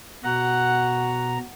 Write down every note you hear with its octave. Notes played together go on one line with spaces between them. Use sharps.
B2 F#4 F#5 A#5